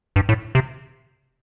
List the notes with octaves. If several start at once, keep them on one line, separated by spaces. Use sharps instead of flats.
G2
A2
C3